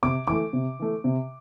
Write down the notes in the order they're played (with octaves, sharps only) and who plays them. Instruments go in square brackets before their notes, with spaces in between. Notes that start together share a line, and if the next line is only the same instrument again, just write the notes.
[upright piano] C3 [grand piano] D6
[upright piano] E3 A3 [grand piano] D6
[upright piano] C3
E3 A3
C3